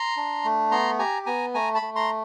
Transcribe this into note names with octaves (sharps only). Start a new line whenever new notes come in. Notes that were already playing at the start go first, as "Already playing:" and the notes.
Already playing: A#5 C6
D4
A3
B3 A#5 C6
G4 G#5 A#5
B3 G#5 A#5
A3 G#5 A#5
A5 B5
A3
A#5 C6